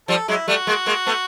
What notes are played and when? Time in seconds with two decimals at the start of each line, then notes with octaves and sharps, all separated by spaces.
0.08 F3 G3 A4
0.28 F#3 G#3 E4
0.48 G3 A3 F#4
0.67 G#3 A#3
0.86 G#3 A#3
1.06 A3 B3